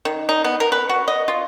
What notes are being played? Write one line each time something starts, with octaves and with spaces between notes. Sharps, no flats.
D#3
D#4
B3
A#4
B4
F#4
D#5
F4